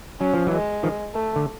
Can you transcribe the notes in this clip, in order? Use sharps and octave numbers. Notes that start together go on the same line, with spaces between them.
F#3 C#4
F3
E3 F#3
G#3
D#3 F3
A3
D3